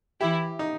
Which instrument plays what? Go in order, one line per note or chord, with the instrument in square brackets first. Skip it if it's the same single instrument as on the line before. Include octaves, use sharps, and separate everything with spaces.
[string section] E3 E4 [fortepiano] G4
[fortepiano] D#4